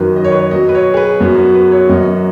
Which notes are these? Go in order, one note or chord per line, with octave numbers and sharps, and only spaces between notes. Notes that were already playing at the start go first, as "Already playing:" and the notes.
Already playing: F#2 D#3 F#3 B4
D#5
C#5
B4
C#5
B2 F#3 D#5
B4
C#5
G#4
B4
F#2 F#3 B3
B3
B4
C#5
F#2 F#3 D#5